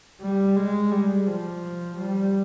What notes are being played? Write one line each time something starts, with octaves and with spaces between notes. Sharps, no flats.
G3
G#3
G3
F3
G3